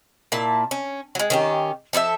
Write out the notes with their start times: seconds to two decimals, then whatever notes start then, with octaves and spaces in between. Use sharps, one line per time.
0.32 A#2 A#3 E4 A5
0.71 C#4
1.15 F#3 G#3
1.30 D#3 C#4 G4
1.93 F3 A4 B4 E5